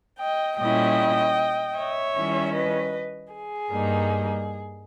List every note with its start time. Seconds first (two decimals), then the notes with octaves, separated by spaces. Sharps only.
0.21 D#5 G5
0.59 A#2 G3 C#4 E4 D#5 G5
1.77 C#5 E5
2.16 D#3 G3 C#4 E4
2.55 B4 D#5
3.33 G#4
3.72 G2 G3 A#3 D#4